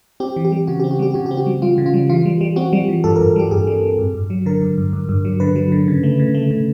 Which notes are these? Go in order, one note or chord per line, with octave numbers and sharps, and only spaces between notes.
C4 G4
E3
G4
G3
C#3 F#4
C4 G4
F#4
G3 G4
C#3 F#4
C4 G4
F#4
G3
G3 F4
C#3
F4
G3
E3 F4
G3
G3
C4 F#4
G3
E3
G2 A4
A#4
G2
G3 G4
G2 G#4
G3
G3
G2
G2
F#3
D3 A#4
G2
G2
G2
G2
F#3
D3 B4
F#3
D3
C#3
A3
C#3
A3
C#3